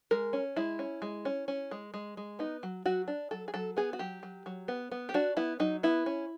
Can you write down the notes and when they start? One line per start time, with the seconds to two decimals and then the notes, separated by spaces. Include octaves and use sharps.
0.11 G#3 A#4
0.33 C#4
0.56 G#3 E4
0.79 C#4
1.02 G#3
1.25 C#4
1.48 C#4
1.71 G#3
1.94 G#3
2.17 G#3
2.39 B3 D#4
2.63 F#3
2.86 F#3 F#4
3.08 D4
3.31 F#3 A4
3.48 G#4
3.54 F#3 A4
3.77 B3 G#4
3.93 F#4
3.99 F#3 G4
4.23 F#3
4.46 F#3
4.68 B3
4.91 B3
5.09 G4
5.14 D4 F#4
5.37 B3 E4
5.60 F#3 D#4
5.83 B3 E4
6.06 C#4